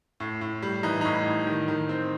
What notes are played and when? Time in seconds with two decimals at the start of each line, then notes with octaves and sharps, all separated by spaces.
0.20 A2
0.41 A2
0.62 G3
0.83 E3 D#4
1.01 A2 D#4
1.26 A2
1.47 D#3
1.68 D#3
1.89 C4